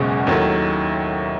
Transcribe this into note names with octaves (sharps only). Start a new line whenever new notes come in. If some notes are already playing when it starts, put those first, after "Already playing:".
Already playing: F#1 E2 B2 G#3 C#4
D#2 D#3 F#3 A3 E4